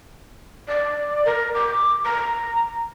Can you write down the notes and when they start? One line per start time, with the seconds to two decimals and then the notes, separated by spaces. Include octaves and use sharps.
0.68 D5
1.26 A#4
1.54 D6
2.05 A#5